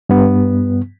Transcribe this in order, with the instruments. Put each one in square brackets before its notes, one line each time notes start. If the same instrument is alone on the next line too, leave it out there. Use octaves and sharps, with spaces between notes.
[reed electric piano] G2 B3